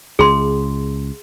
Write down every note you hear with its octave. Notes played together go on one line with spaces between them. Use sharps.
C#2 G#4 C6